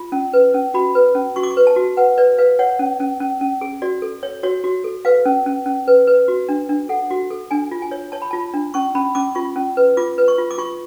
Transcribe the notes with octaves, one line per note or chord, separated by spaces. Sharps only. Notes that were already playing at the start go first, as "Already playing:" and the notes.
Already playing: F4
C#4
B4
C#4
F#4 B5
B4
C#4
F#4 C#6
D6
C#6
B4
A5
F#4
B4 F#5
B4 D5
B4 F5
C#5 F#5
C#4
C#4
C#4
C#4
G#4
F#4 D5
A4
C#5
F#4 C#5
F#4
A4
B4 F5
C#4
C#4
C#4
B4
B4
F#4
D4
D4
A4 F#5
F#4
A4
D4 G#5
F4
G#5
C#5
C#5 A5
B5
F4 A5
D4
C#4 C#6
C#4 B5
C#4 D6
F4 C#6
C#4
B4
F4 D6
B4
C#6
F4
D6
F4 C#6